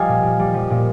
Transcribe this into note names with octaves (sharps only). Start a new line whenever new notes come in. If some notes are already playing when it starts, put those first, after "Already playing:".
Already playing: F3 G3 D#5 F5 G#5
A#2
A#2
G3
F3
A#2